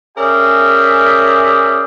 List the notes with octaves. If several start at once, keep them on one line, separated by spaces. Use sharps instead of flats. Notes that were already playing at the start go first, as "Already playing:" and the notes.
C#4 G#4 A#4 D5 E5 G5